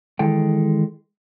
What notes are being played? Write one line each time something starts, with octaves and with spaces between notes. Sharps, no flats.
D#3 E3 G#3 A4 G5